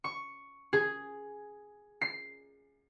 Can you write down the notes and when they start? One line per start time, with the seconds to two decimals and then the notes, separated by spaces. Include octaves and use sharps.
0.04 C#6
0.73 G#4
2.01 C7